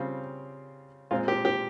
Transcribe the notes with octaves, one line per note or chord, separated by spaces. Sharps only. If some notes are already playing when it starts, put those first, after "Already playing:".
Already playing: C#3 G3 C4 F4
A#2 G#3 C4 F4
G4
G4